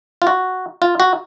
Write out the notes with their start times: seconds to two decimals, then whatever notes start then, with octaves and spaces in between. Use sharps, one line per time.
0.22 F4
0.27 F#4
0.82 F4
1.00 F#4